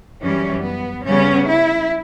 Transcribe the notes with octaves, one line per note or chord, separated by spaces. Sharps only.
F#2 E3 G3 C#4
B3
C#3 G3 B3 C#4
E4